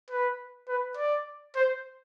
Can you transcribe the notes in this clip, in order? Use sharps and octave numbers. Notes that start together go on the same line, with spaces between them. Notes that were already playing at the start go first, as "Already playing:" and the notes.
B4
B4
D5
C5